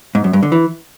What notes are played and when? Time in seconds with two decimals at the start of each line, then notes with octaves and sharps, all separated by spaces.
0.15 G#2
0.24 F#2
0.33 G2
0.43 D3
0.52 E3